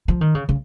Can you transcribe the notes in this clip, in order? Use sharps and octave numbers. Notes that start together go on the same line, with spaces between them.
F3
D#3
C#3
C#3